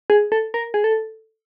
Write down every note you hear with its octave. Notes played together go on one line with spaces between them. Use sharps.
G#4
A4
A#4
G#4
A4